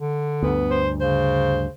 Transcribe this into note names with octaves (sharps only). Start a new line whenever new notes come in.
D3
D2 G2 B3
C5
C#3 C5